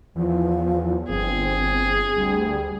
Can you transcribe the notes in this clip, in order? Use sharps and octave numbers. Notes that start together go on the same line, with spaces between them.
E2 F3
G1 C4 G#4
D2 G3